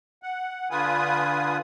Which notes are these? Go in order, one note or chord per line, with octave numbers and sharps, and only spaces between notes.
F#5
D3 F4 B4 G#5 D#6